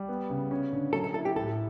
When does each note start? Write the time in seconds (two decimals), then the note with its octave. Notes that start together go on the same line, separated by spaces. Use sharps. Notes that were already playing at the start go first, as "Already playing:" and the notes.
Already playing: G3
0.08 B3
0.30 C#3
0.51 C#4
0.72 D3
0.93 F#3 A4
1.04 A4
1.14 E4 A4
1.25 G4
1.36 A2 A4